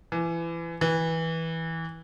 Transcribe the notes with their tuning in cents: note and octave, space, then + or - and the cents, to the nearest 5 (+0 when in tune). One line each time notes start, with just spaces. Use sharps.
E3 +25
E3 -15